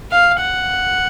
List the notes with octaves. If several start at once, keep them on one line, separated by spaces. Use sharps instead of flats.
F5
F#5